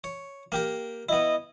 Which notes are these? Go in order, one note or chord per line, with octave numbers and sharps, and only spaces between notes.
C#5
A#3 G4 A#4
B3 E4 D#5